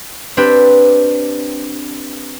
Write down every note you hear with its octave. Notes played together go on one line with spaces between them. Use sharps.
C4 D4 G4 B4